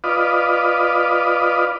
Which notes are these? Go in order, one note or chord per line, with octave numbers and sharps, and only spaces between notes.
F4 B4 D5 D#5